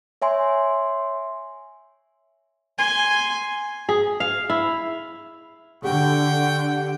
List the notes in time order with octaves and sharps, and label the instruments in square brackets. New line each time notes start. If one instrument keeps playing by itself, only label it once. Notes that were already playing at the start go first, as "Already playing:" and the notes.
[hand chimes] C#5 E5 G#5 C6
[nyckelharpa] G#5 C6
[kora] G#4
F5
E4
[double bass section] D3 [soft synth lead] G4 [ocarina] F#5 [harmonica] G5 C#6